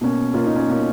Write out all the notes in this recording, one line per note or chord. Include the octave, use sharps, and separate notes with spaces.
B2 A#3 C#4
B2 A#3 C#4 F4
D#4
C#4
B2 A#3 C#4